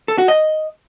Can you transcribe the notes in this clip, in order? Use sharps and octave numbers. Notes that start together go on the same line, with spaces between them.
A4
F#4
D#5